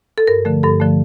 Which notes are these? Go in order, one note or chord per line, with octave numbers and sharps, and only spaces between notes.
A4
G2 A#4
D3 F3 A3
G2 A4
D3 F3 A3